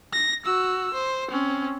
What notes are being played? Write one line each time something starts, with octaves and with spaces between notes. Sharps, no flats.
A#6
F#4 E6
C5
C4 C#4